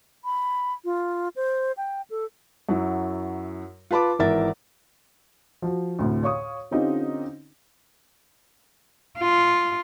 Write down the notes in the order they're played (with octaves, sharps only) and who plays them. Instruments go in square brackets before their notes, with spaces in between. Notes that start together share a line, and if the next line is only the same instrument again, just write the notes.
[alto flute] B5
F4
C5
G5
A4
[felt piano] F#2 F#3 E4
F4 B4 A5 B5 D6
G#1 E3 A#4 E5 A6
[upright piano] F3 F#4
D2 A2 C3
C#5 F5 C#6 D#6
D3 C4 C#4 D#4 F4 G4
[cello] F4